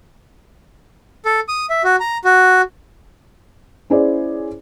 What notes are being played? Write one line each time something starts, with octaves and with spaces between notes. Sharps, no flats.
A4
D#6
E5
F#4
A#5
F#4
C#4 E4 G#4 C5 D5